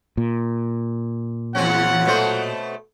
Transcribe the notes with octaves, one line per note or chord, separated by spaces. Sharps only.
A#2
E2 F#3 C4 C#4 F4 F#5
B2 A3 C5